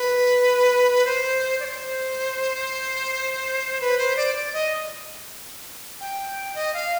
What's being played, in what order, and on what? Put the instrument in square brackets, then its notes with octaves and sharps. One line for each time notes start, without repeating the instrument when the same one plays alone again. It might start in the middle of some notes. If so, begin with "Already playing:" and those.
Already playing: [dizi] B4
C5
D5
C5
B4
C5
D5
D5
D#5
G5
D#5
F5